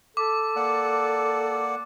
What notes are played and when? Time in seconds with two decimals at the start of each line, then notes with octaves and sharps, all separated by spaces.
0.17 A4 D6
0.56 A#3 D5 F#5